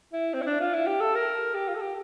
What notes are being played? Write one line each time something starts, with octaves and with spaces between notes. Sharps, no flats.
E4
C4
E4
D4
F4
E4
G4
A4
A#4
G4
F4
A4
G4